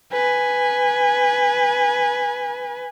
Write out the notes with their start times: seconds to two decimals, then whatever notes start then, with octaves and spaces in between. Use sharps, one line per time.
0.12 B4 G#5